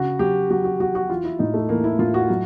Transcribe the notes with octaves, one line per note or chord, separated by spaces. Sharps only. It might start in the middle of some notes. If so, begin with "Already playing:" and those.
Already playing: C#3 F#4
F#3 G4
F#3 F#4
F#4
F#3 F#4
F#4
E3 F4
E4
A2 D#4
A3
E3 A#3
E4
A2 F4
F#4
F#3